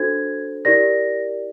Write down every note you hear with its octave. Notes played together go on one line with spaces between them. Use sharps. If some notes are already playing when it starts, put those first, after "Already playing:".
Already playing: D4 F#4 A4 C5 G#6
E4 G4 A#4 D5 A#6